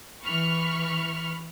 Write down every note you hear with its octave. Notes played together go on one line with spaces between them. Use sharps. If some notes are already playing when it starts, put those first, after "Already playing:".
E3 B5 C#6 F6